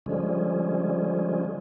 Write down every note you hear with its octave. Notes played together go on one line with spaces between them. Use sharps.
D3 F3 G3 G#3 C#4